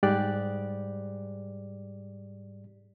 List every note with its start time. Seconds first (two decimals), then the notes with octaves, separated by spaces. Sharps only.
0.03 G#2 G3 G4 G#4 D5 F#6